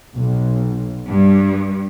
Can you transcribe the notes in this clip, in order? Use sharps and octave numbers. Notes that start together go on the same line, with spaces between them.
B1
G2